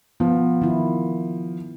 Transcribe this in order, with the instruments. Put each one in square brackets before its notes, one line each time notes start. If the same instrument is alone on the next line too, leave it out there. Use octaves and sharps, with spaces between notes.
[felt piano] F3 [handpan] B3
[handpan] D#3 E4